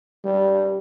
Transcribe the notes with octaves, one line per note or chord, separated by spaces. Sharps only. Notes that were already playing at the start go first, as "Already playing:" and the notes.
G3